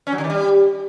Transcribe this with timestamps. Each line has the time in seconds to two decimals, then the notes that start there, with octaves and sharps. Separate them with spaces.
0.07 C#4
0.12 F#3
0.18 D3
0.24 D#3
0.30 G3